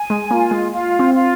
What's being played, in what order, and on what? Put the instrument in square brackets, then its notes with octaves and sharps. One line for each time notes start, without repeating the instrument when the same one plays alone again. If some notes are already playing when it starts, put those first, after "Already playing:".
Already playing: [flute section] G#5
[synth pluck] G#3
[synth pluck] A#3 [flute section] F4
[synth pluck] G#3
[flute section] F4
[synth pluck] C4
[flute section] F4